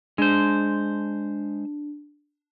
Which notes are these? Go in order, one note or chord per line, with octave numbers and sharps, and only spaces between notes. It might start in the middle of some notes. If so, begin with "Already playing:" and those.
G#3 D4 C5